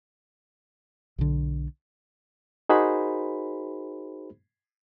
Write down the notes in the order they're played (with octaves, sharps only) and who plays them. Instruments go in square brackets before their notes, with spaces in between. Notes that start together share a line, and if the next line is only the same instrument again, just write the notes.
[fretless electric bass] B1 D3
[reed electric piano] D#4 F#4 G#4 A#4 C5 B5